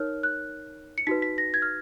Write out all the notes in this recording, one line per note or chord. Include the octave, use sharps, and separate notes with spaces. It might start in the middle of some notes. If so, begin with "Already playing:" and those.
Already playing: D#4 A#4 C#5 F6
F#6
C#7
D#4 F#4 B4 B6
B6
A#6
G#6
F6